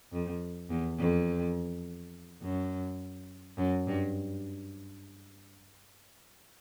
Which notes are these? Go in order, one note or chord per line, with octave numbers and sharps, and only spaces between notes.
F2
E2
F2
F#2
F#2
G2